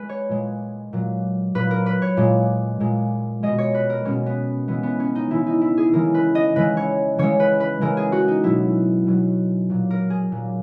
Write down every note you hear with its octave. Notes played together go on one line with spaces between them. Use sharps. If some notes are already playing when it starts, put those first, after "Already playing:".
Already playing: G#3 B4
C#5
A#2 G#3
A#2 F#3
A#2 F#3 B4
A#4
B4
C#5
A#2 G#3
A#2 G#3
B2 G#3 D#5
C#5
B4
A#4
B2 G#3 C#4
B3
C#3 E3 G#3 B3
B3
C#4
D#4
C#3 E3 G#3 E4
D#4
E4
G#4
C#3 E3 G#3 A#4
B4
D#5
C#3 E3 G#3 B4
C#5
C#3 E3 G#3 C#5
B4
B4
C#3 E3 G#3 A#4
G#4
F#4
D#4
B2 F#3 E4
B2 F#3
A#2 F#3
A#4
G#4
A#2 F#3